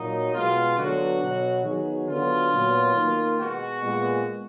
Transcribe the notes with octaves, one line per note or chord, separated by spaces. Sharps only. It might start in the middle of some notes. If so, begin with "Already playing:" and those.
Already playing: A#2 F#3 A#3 D#4
B2 G#3 B3 F4
D3 F#3 B3 F#4
B2 F#3 B3
D#3 F#3 B3 G#4
D3 F#3 B3 F4
A#2 F#3 B3
D#3 A#3
B2 G#3 B3 F#4
A#2 G#3 B3